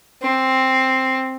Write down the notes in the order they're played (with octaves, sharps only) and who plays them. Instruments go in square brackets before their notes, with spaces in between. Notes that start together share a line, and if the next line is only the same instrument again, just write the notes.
[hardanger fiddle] C4